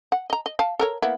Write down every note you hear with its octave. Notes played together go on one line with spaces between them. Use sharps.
F#5
D#5 A#5
D#5
F5 A5
A4 A#4 C#5
A#3 B3 E4